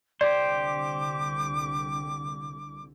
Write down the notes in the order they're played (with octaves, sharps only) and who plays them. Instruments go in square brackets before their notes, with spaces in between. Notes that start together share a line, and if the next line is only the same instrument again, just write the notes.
[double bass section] C2 D3 [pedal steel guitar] G4 C5 [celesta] D5 [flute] D6